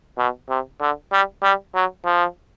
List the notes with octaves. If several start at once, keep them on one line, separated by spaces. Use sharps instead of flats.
B2
C3
D3
G3
G3
F#3
F3